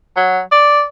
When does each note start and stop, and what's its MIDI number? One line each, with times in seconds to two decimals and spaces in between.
0.17 0.40 54
0.52 0.83 74